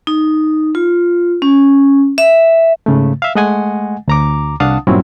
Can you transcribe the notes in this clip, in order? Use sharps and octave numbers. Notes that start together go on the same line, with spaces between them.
D#4
F4
C#4
E5
G#2 C#3 A3
E5 F5
G#3 A3 D#5 F#5 G#5
D2 A#5 D6
C2 D4 F5 F#5 A5 D#6
G2 A#2 F#3 C4 C#4 E4